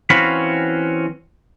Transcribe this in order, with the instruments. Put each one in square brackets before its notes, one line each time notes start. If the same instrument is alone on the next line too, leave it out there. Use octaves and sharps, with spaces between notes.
[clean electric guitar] E3 C4 C#4 F#4 F5 B5